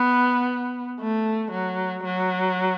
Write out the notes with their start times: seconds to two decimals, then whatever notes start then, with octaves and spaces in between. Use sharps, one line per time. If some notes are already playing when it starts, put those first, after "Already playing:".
Already playing: B3
1.00 A3
1.52 F#3
2.04 F#3